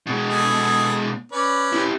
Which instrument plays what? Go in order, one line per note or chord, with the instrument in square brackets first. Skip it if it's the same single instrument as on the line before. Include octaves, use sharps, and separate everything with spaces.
[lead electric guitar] B2 G#3
[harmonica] G#4 A4
C#4 B4 D5
[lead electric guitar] E4 G4